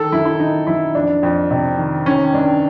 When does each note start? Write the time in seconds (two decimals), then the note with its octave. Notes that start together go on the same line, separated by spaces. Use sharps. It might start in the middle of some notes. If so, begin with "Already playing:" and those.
Already playing: D#3 A4
0.12 F#2 E4
0.25 E4
0.39 D#3 D#4
0.67 F#2 E4
0.95 F2 D4
1.23 F2
1.51 C3
1.78 D#3
2.06 D#3 C#4
2.34 G2 D4